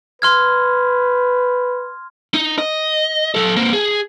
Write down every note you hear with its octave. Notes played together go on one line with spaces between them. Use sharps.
B4 C6 F6 G#6
D#4
D#5
F#3 A4
A#3 C4
G#4